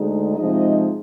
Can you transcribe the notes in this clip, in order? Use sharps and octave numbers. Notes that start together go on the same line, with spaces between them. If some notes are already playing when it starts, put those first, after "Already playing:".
Already playing: D2 D3 G#3 D#4
C3 F3 G#3 D#4 D#5